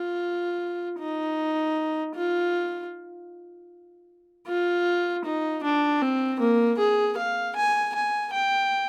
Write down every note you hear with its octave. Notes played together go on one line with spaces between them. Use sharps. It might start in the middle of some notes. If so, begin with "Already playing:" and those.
Already playing: F4
D#4
F4
F4
D#4
D4
C4
A#3
G#4
F5
G#5
G#5
G5